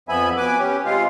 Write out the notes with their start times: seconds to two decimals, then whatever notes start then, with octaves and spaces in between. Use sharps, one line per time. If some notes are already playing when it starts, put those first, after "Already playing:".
0.09 F2 F3 B3 E5 G#5 B5
0.37 B2 B4 G#5 D6
0.58 C#4 G4
0.85 C3 G#3 F4 F5